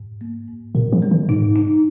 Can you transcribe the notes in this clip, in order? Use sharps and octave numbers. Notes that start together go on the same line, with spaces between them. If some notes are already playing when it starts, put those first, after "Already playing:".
Already playing: G#2
A#3
G#2
A#2 A#4
F3
G#3
D#3
G#2 D#4
D#4